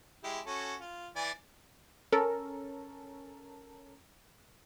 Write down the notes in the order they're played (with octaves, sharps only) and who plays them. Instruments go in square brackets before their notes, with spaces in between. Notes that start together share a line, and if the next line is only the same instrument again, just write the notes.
[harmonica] G#3 E4 G4
C#4 F#4 A4
F4
E3 D5 G#5
[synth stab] C#4 A4 A#4